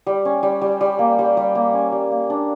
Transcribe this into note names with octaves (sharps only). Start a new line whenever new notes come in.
G3
C#4
G3
G3
G3
A#3
G3
G3
A#3
C#4
G3
A#3
D4